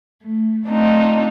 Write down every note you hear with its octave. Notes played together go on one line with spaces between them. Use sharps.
A3
A3 C4 D4 D#4 F4